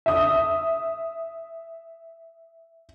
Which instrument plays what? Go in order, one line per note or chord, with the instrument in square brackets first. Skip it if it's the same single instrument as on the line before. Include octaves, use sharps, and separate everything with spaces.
[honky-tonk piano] E5 D#6